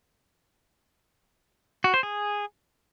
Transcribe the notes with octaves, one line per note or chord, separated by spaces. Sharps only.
F#4
C5
G#4